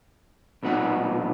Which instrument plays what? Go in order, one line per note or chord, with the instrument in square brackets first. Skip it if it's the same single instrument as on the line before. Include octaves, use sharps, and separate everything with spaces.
[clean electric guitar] B1 A#2 B3 D#4 F#5